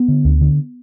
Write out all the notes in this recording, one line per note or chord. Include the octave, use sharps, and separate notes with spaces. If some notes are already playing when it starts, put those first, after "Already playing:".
Already playing: B3
D3
D2
D3